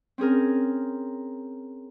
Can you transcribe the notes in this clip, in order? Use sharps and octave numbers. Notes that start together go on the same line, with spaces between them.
C4 C#4 G#4 A#4